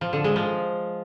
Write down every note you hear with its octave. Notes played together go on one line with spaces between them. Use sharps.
F3
D3
G#3
F3